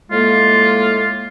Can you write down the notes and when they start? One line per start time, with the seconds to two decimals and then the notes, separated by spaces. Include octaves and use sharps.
0.11 A2 G#3 A#3 F4